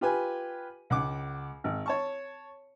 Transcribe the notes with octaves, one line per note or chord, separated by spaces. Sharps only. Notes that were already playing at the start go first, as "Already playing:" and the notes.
F4 G4 B4 G#5
C#2 F#5 D6
G#1
C#5 A5 C#6